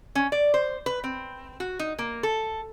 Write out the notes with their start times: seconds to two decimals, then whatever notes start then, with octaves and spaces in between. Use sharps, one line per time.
0.15 C#4
0.32 D5
0.54 C5
0.86 B4
1.04 C4
1.60 F#4
1.79 D#4
1.99 A#3
2.23 A4